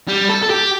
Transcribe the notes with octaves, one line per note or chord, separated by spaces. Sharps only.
G3
A4
A4
G4